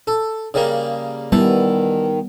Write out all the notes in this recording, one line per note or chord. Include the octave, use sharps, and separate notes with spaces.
A4
C#3 G3 A#3
D#3 E3 G3 B3 A5